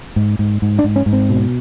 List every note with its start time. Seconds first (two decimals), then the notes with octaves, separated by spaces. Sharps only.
0.16 G#2
0.39 G#2
0.62 G#2
0.79 D4
0.84 G#2
0.96 C#4
1.06 G#2
1.13 C4
1.30 B2